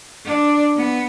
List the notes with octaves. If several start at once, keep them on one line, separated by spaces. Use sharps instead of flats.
D4
B3